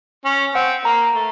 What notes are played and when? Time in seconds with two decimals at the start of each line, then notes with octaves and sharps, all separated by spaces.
0.25 C#4
0.55 C4 F#5
0.85 A#3 A#5
1.14 A3